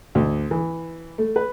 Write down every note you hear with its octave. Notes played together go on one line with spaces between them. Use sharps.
D2
E3
A3
B4